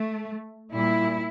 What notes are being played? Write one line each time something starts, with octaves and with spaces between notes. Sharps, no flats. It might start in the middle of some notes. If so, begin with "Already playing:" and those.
Already playing: A3
A#2 G3 E4